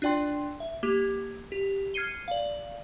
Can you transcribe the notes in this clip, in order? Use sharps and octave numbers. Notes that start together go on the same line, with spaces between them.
D4 F4 D5 G5 C6
E5
A#3 G4
G4
F6 G#6 C7 C#7 D#7 G7
D5 F5